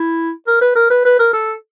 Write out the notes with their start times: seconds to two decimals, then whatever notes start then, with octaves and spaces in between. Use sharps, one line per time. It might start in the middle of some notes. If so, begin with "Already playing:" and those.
Already playing: E4
0.47 A#4
0.61 B4
0.76 A#4
0.90 B4
1.05 B4
1.19 A#4
1.33 A4